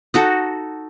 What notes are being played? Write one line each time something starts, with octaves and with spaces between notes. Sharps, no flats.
D#4 F#4 A4